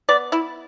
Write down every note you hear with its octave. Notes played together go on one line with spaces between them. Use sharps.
B3 D5
E4